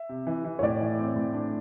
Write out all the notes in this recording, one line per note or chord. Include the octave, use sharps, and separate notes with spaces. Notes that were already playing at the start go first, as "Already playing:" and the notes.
Already playing: E5
C3
E3
E3
C#5
A2 D5
E3
C4
A2
D4